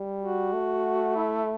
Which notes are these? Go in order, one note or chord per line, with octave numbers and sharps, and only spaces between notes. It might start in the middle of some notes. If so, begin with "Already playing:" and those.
Already playing: G3
F#4
A3
E4